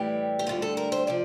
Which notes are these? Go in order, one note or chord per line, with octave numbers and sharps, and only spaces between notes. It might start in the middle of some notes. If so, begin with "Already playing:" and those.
Already playing: A2 E3 G3 G4
G4
D2 D3 G3 F4
A4
A#4
C5
C3 F3 D5